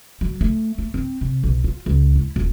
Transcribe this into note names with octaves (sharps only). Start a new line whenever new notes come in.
F#3
A3
A3
C4
C3
B1
F4
C#2
E4
D#1